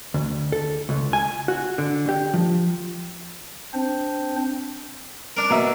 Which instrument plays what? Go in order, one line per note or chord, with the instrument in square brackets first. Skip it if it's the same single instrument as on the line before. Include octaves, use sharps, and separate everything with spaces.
[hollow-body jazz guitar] D2
A4
C#2
G#5
F#4
D3
G4
F3
[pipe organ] C4 D4 C5
[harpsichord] D4 A#4
[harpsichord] B2 [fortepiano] A#3 E5